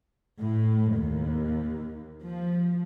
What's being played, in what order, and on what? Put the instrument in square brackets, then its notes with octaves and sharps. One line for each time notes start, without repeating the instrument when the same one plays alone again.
[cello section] A2
D#2
F3